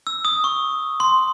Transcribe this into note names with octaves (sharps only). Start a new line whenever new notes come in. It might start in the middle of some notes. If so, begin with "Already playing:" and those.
E6
D#6
C#6
C6